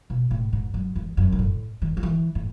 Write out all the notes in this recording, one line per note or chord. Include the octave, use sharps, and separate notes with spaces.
B2
A2
G#2
F#2
E2
F#2
G#2
A2
D#3
D#3
E3
A2